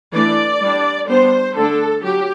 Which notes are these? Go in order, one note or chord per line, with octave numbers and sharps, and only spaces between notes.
E3 A3 D4 D5
G3 D4
G3 B3 D4 C5
D3 A3 D4 A4
F#3 G4